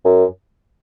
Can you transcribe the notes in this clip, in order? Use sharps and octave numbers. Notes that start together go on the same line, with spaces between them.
F#2